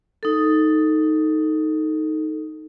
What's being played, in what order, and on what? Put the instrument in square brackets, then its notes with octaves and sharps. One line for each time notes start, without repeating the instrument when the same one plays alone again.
[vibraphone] D#4 A4